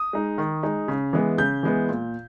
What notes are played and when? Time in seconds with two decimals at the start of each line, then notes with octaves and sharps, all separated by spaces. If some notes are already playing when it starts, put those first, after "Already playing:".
Already playing: D#6
0.13 G#3 D#4
0.38 D#3
0.63 G#3 D#4
0.88 C#3
1.13 E3 G#3 B3
1.38 C#3 G6
1.63 E3 G#3 B3
1.89 A#2